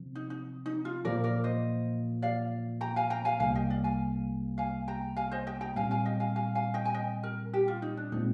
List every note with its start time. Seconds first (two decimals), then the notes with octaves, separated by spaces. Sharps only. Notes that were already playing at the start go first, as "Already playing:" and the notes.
Already playing: C3 F3 C4
0.15 D#4
0.30 D#4
0.66 D#4
0.85 F4
1.05 A#2 F3 A#3 F4 A#4 D5
1.24 A#4 D5
1.44 C5 D#5
2.22 D5 F5
2.81 G5 A#5
2.96 F5 G#5
3.10 G5 A#5
3.25 F5 G#5
3.40 C2 C3 G3 A#3 F5 G#5
3.55 D#5 G5
3.70 D5 F5
3.84 F5 G#5
4.58 F5 G#5
4.88 G5 A#5
5.17 F5 G#5
5.31 C5 D#5
5.47 D#5 G5
5.61 G5 A#5
5.76 A#2 G3 C4 F5 G#5
5.91 F5 G#5
6.05 D#5 G5
6.20 F5 G#5
6.36 F5 G#5
6.55 F5 G#5
6.74 D#5 G5
6.85 G#5
6.94 D#5 G5
7.23 A#4
7.53 G4
7.68 F4
7.82 D#4
7.97 D4
8.12 A#2 G#3 C4 D#4